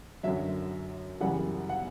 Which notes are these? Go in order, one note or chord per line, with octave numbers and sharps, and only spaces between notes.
F#2 D3 F#3 E5
F#2 C#3 E3 G3 F#5
F#5